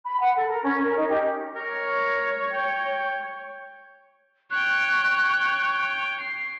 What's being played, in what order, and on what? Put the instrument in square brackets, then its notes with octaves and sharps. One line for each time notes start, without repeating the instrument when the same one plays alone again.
[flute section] B5
F#5
A4
A#4
C#4
A#4
D#4
G4
[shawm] A#4 [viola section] C#5
[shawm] G5
[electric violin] C#5 G5 [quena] C#6 [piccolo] F#6
[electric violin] C7